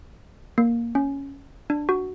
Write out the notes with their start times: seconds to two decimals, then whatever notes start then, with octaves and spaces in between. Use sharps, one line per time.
0.58 A#3
0.95 C#4
1.70 D4
1.89 F#4